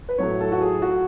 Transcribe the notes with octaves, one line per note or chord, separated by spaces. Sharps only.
B4
A2 F#3 A3 C#5
A4
F#4
G#4
F#4